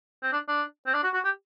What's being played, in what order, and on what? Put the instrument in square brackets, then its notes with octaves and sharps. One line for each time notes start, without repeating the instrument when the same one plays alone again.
[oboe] C4
D4
D4
C4
D4
F#4
F#4
G4